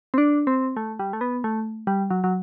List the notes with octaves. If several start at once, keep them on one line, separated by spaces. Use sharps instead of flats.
C4
D4
C4
A3
G3
A3
B3
A3
G3
F#3
F#3